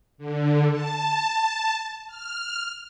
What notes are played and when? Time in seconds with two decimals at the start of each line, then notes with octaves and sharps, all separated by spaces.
0.18 D3
0.71 A5
2.07 F6